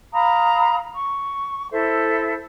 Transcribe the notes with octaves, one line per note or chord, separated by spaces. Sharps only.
F5 A#5 B5 D#6
C#6
E4 A4 C5 E5